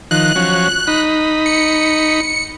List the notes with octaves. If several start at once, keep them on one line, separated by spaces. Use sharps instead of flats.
D#3 F3 F#6
F3 F#3 C#4
D#4 B5
C#7